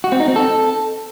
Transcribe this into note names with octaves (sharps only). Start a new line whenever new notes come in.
F#4
C4
D#4
C4
A4